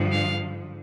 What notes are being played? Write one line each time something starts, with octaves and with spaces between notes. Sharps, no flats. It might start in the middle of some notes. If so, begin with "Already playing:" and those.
Already playing: G2 D3 F3
F5